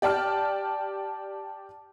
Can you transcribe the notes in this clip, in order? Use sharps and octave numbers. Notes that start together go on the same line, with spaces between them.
G4 D5 G5 A5 F6